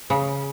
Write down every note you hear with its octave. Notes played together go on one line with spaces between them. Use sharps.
C#3